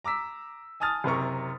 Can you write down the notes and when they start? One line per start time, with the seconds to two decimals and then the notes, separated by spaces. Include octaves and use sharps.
0.04 A#5 D6 E6 B6
0.80 G#5 A5 D#6 F6 A6
1.04 F#1 C3 A#4 C#6